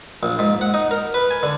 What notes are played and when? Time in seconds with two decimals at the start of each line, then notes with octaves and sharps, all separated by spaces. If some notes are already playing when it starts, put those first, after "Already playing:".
0.23 A#1
0.39 G#2
0.61 F#5
0.74 D#4
0.91 A#4
1.14 B4
1.31 G#5
1.43 D3